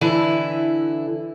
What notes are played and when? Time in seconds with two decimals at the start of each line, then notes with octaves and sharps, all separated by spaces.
0.01 D3 E3 E4